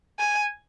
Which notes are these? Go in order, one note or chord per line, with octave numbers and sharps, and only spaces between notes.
G#5